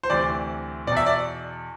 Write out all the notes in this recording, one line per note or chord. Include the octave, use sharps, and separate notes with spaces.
C5
D2 C3 E3 D5
E2 B2 D5
E5
D5